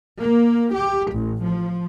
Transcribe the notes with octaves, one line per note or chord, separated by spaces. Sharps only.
A#3
G4
A1
F3